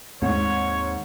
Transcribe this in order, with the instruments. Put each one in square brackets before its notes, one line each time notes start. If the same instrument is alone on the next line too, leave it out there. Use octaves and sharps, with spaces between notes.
[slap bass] D#2 C4 [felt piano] G#2 [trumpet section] C#5